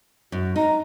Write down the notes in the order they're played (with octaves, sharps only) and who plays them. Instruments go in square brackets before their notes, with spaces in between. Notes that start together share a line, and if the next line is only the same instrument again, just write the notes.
[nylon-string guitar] F#2 [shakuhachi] F#4
[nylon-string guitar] D#4 [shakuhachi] A#5